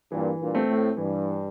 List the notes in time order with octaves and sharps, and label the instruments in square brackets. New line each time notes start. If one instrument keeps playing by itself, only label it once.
[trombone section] G2 A#2 [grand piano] E3
[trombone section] G2 A#2
[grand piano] A3 C4
[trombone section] A2
[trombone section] G2 [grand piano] E3